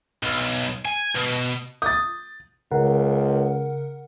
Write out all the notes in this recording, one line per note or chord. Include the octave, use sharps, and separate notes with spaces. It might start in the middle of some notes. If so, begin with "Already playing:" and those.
B1
G#5
B2
D#6 G6 A6
C#2 C#3 A#4 F#5